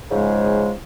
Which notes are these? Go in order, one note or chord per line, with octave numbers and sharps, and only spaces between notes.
G#2 C#3 F3 G#3